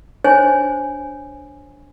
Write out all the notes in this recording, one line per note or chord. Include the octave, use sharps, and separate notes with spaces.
D4 C5 C#5 G#5